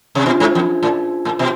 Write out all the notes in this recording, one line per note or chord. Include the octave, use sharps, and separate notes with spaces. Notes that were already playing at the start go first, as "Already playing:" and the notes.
C3
B2 D4 F4 G#4 C5 G#5
G#2
F2
A2
A2
B2